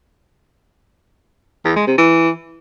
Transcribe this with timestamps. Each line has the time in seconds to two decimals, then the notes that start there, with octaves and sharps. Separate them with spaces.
1.65 E2
1.76 G#3
1.87 C3
1.98 E3